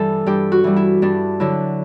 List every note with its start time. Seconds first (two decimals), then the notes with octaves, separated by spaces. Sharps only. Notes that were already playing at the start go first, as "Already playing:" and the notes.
Already playing: G2 E3 G3 A4
0.26 G2 G4
0.52 F#4
0.64 E3 G3
0.76 E4
1.02 G2 D4
1.40 D3 F#3 E4